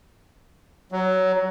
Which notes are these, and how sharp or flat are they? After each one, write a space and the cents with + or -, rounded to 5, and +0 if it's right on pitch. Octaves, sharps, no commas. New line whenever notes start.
F#3 +15